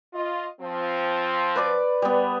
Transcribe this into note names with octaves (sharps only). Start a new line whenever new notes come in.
F4 D#5
F3 C4
B4 D5 D6
G3 B3